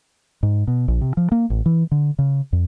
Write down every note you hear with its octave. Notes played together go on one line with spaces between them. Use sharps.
G#2
B2
A#1
C3
F3
A#3
A1
E3
D3
C#3
F2